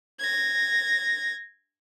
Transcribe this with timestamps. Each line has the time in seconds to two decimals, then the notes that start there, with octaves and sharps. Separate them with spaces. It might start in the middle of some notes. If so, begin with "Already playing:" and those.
0.19 G#6 A#6